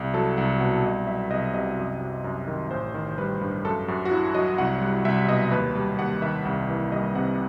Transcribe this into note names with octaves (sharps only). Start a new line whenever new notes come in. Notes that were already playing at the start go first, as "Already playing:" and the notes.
Already playing: C2
F#3 A4
C2 F#5
B2 F#5
C2 D#5
F#3 E5
C2 D#5
C3 D#5
F#2
F#3
F#2
D#3
A1 C5
D#3
G3 B4
G2
F#2 A4
F#2 F#4
F#4
F#3 E4
F#3 D#5
C2 F#5
G3
C2 E5
B2 D#5
D#2 B4
G3
D#2 F#5
D#3 E5
C2
E3
G3 D#5
C3 F#5